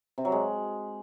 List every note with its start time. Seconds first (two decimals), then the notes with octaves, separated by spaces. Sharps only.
0.18 C3
0.25 F#3
0.32 G#3